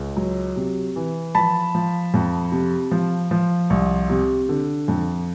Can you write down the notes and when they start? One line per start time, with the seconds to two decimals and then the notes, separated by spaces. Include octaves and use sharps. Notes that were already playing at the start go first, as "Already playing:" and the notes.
Already playing: C#2
0.17 F#3
0.56 C3
0.96 E3
1.35 F3 A5 B5
1.75 F3
2.14 F2
2.52 C3
2.91 F3
3.31 F3
3.70 C2
4.09 C3
4.49 D3
4.88 F2